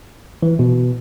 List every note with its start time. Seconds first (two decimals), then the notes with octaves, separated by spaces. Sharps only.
0.43 E3
0.59 B2